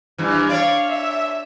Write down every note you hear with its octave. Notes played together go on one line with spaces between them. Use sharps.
G2 E3
C#5 D5 F5
E5